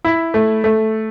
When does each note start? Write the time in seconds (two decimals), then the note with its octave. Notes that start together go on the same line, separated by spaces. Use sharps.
0.04 E4
0.34 A3
0.64 A3